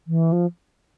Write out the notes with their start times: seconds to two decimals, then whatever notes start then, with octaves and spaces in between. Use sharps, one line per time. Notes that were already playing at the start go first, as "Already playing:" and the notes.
0.07 E3
0.32 F3